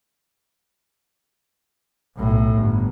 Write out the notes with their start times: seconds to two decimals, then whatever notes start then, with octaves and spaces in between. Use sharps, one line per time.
2.17 B1 A2
2.55 G1